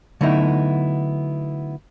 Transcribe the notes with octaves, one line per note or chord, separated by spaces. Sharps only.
D3 F#3 A3 B3 D#4 E4